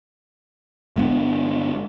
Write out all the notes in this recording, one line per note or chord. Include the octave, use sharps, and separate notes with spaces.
G1 G#3 B3 D4